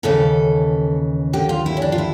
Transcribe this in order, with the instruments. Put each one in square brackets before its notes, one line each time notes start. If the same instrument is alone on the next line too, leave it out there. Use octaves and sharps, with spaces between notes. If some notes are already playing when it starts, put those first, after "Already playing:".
[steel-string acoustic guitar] D#2 C#3 E3 A4
D#2 D3 G4
F4
E4
C#4
D4
F4
E4